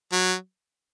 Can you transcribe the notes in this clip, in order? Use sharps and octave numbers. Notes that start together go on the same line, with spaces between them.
F#3